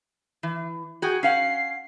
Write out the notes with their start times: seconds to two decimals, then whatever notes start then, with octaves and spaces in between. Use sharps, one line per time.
0.43 E3
1.02 F#4 G#4 G5
1.23 C#4 F5 F#5 C7